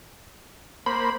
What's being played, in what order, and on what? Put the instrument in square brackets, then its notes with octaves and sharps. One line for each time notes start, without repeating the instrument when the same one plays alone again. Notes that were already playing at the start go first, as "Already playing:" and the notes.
[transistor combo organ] A#3 C5 [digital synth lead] B5